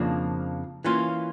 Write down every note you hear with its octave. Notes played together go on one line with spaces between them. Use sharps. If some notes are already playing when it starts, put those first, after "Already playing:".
Already playing: F2 C#3 F3 A#3 D4
E3 A#3 C#4 F4